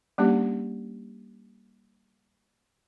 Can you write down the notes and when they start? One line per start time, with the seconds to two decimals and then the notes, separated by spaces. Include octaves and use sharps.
0.18 G3 A#3 C#4 D4 G4